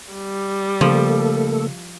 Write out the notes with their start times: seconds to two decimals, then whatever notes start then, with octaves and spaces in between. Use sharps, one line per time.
0.13 G3
0.81 C#3 F3 A3 A#3 A4